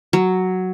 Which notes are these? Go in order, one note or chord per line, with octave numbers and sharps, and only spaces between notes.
F#3